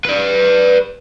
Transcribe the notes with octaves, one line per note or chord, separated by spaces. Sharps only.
B4 D5